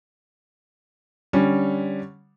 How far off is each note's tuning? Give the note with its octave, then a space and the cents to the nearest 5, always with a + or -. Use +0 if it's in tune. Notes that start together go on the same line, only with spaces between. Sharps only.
D3 +0 G3 +0 C#4 +0